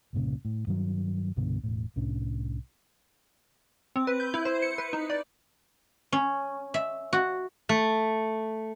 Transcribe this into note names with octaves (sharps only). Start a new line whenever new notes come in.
C2 G2 A#2 C#3
A2
G2 D#3 F#3
C2 G2 B2 D3
E1 A2
C2 A2 C#4 D4
C4
B4
G6
E4
C5
C#7
B4
D#4
D5
C#4
E5
F#4
A3